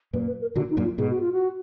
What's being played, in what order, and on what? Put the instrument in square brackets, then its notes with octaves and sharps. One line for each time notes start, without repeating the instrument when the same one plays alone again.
[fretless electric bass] F#2 A#2 [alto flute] B4
[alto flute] B4
A#4
[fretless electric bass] A#2 D3 [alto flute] F#4
[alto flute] D#4
[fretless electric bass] F#2 A#2
[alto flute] F4
[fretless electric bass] G#2 B2 [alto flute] G#4
[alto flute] F#4
F4
F#4